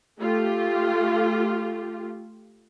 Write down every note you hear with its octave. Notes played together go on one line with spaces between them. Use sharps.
A3 F4 G4